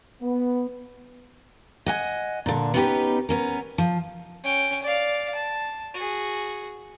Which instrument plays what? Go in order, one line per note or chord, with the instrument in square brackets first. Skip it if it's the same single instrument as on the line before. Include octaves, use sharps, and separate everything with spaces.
[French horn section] B3
[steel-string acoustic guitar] D#5 F#5 G#5
A#2 D3
B3 C#4 D#4 F4 G4 B4
B3 C#4 A#4
F3
[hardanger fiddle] C#4 G5
D5 F5
A5
F#4 G#4